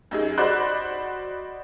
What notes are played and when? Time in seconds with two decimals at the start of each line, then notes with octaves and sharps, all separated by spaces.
0.11 F#2 D#4 G#4
0.38 F#4 C5 D5 D#5 B5 F#6